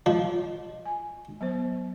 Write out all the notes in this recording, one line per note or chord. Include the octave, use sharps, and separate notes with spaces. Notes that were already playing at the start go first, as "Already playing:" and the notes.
F3 D#5
G#5
F#3 B3 C5